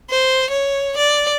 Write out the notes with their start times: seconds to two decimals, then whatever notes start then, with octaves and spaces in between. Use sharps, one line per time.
0.10 C5
0.50 C#5
0.97 D5